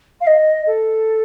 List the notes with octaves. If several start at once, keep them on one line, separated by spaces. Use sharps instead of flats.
F5
D#5
A4